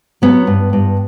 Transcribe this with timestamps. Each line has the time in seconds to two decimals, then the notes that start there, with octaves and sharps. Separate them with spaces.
0.22 F#3 B3
0.47 G2
0.73 G2